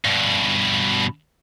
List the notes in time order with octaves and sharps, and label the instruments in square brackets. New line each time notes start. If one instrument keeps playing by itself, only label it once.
[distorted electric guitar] G2 B2